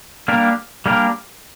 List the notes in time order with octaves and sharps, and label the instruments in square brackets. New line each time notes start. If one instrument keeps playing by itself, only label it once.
[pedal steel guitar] G3 A#3 D4 G4 A#4
G3 A#3 D4 G4 A#4